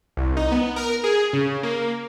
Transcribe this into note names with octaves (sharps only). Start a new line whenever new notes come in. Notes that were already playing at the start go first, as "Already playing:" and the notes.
C2
D#4
B3
A#4
G#4
C#3
A#3